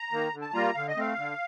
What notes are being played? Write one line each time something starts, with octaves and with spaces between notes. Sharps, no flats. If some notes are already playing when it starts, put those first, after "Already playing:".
Already playing: A#5
D#3 A#3
D3
A5
G3 A#3 F4 A#5
D3 F5
D#5
A3 C4 F5
D3